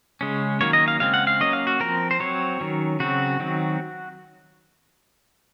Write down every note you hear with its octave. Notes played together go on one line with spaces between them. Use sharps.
C#3 G#3 C#4
D#3 F#3 A#3 C#4 C#5
D#5
F5
C#3 G#3 C4 F5
F#5
F5
F#3 A#3 C#4 D#5
F5
F#4
F3 C4 A#4
C5
F#3 C4 C#5
D#3 F#3 C#4
C#3 F#3 C4 F#4
D#3 F#3 C4